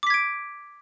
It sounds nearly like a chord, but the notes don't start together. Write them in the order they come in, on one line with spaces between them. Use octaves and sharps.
D6 B6 G#6 D7